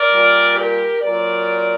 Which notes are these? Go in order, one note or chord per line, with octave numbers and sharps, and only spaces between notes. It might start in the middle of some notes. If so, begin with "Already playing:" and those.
Already playing: A#4 D5
A#2 G3
G4 A#4
A#2 F#3 A#4 D5